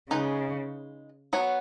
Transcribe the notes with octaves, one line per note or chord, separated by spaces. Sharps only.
C#3 G#3 D#4 B4 D#5
F#3 B3 F#4 C#5